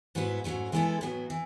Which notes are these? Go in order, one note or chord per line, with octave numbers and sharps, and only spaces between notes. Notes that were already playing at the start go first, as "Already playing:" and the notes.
G#2 F#3 B3 E4 B4
G#2 F#3 A3 C#4
E3 G#3 B3 E4 A4
A2 F#3 B3
E3